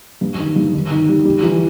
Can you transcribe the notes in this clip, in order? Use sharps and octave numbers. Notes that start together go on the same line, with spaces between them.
G2
D#3
G2
D#3
D#3
G3
G3
E3